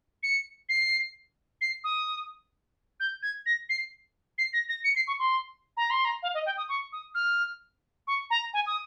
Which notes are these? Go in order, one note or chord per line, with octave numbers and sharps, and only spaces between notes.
C#7
C7
C7
D#6
G6
G#6
A#6
C7
C7
A#6
A#6
C#7
C7
C#6
C6
A#5
C6
A#5
F5
D#5
G5
D#6
C#6
D#6
F6
C#6
A#5
G#5
D#6